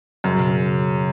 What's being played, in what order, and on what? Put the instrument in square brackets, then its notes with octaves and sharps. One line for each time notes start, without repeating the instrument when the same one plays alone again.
[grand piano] F#2 [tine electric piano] C#3
[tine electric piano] B2
C#3